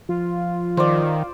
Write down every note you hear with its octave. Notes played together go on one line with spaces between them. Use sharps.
F3 F4
D#3 C5 D5